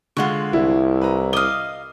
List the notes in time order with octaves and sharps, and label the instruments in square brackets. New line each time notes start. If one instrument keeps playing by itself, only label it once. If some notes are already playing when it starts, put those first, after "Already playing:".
[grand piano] D3 G#3 [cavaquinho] F4 F#5 C#6
[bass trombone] C2 [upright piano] E4
[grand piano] B4 A#5
[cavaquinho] D#5 F5 [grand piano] D6 D#6 [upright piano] G7